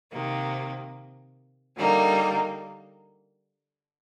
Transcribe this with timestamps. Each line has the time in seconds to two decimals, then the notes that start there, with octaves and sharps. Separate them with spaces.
0.11 C3 D#3 A#3
1.77 D3 G3 A#3 D#4